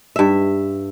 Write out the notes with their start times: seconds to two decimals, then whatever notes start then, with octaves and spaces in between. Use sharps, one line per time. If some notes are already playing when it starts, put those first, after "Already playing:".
0.16 G2 E5